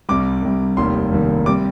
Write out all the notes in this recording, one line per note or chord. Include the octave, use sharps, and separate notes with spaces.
C2 C3 G3 D6
C2 C3 G3
F1 D#2 D#3 G3 C6
F1 D#2 D#3 G3
C3 G3 D6